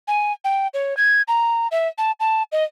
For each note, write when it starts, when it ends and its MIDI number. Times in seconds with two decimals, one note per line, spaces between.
0.08 0.32 80
0.44 0.67 79
0.74 0.97 73
0.97 1.22 92
1.28 1.67 82
1.71 1.88 76
1.98 2.12 81
2.20 2.43 81
2.52 2.64 75